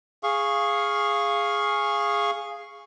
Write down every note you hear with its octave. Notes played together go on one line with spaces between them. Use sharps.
G#4 F5 C#6